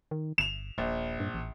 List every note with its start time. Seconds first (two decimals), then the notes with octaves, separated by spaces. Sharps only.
0.11 D#3
0.38 G1 E7 F7
0.78 D#1 A#1
1.20 G2
1.34 A1